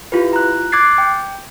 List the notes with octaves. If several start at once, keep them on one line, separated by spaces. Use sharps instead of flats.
E4 F4 G4 B4
A#5 F#6
D6 F#6 G#6 A6 C7
G5